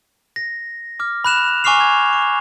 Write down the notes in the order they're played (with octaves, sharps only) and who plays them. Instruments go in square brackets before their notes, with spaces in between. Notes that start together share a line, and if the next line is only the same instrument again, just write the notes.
[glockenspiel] A#6
D6 F6
B5 F#6 E7 F7
G#5 C#6 D6 F6 C7 F7
G#6
C#6